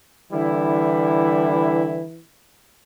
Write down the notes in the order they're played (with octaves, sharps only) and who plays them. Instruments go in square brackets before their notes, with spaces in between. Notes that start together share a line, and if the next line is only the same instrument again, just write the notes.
[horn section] D3 G3 E4 [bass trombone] E3